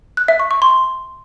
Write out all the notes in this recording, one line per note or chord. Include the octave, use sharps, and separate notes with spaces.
F#6
E5
C#6
C#6
C6